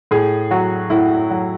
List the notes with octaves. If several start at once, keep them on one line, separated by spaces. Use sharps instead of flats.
A2 G#4
F#3 F#4
A2 E4
F#3